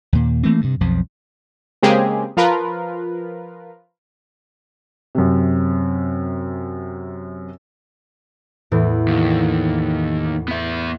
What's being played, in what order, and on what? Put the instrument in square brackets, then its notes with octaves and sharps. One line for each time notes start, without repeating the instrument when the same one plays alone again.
[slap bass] D#2 A#2
E3 A3 A#3 C4
G2 C3
B1 F2 F3
[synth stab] C#3 G#3 A#3 C4 G4 G#4
F3 F4 A#4 B4
[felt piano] F#2 C3
[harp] E2 A2 E3
[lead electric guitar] D#2
B3 E5